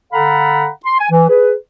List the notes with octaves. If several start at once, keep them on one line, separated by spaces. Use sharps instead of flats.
D3 A4 F5 F#5 A#5 B5
C6
G#5
E3
G#4 B4